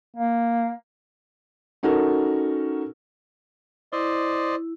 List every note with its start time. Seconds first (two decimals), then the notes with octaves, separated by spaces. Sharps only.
0.16 A#3
1.83 C#4 D#4 F#4 A4 A#4
3.93 E4 C5 D5 D#5